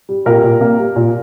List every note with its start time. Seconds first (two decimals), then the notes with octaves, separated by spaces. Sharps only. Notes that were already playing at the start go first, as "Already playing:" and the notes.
0.09 G3
0.26 A#2 G4 A#4
0.43 A#2
0.61 A#3
0.78 G3
0.96 A#2